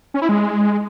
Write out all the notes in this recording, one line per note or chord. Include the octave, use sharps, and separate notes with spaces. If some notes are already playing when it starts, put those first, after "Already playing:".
C#4
E4
G#3